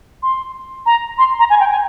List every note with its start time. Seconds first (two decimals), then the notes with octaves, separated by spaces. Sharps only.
0.23 C6
0.86 A#5
1.18 C6
1.39 A#5
1.50 G#5
1.60 G5
1.71 G#5